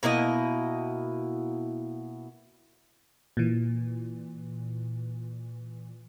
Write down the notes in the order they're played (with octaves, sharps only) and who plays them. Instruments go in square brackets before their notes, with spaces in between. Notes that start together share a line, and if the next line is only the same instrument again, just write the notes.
[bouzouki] B2 A#3 E4 D#5
[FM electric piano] A#2 E3